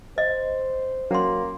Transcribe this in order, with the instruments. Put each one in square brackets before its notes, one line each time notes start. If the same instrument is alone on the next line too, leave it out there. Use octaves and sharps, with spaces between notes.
[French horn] C5 [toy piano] D#5
[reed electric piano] F#3 [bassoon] A#3 [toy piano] C#4 C6